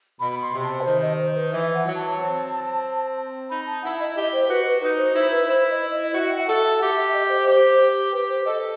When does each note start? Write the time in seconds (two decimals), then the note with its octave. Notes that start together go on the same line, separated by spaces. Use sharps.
0.20 B2 B5
0.42 C6
0.53 C3
0.64 A5
0.81 B4
0.85 D#3 C5
1.02 D#5
1.19 C5
1.35 B4
1.52 E3 E5
1.74 F#5
1.85 F#3
1.95 A5
2.18 C4
3.50 D#4 B5
3.66 A5
3.83 E4 F#5
4.00 D#5
4.16 G4 D#5
4.33 C5
4.48 F#4 B4
4.66 B4
4.81 D#4 B4
4.98 C5
5.15 E4 C5
5.31 B4
5.48 E4 C5
5.70 D#5
5.91 D#5
6.13 F#4 E5
6.30 G5
6.40 E5
6.47 A4 F#5
6.63 E5
6.79 G4 F#5
6.97 E5
7.13 D#5
7.29 C5
7.46 G4
8.12 G4 B4
8.29 C5
8.45 A4 D#5